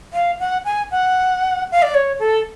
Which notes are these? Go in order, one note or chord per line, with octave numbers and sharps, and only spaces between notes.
F5
F#5
G#5
F#5
F5
D5
C#5
A4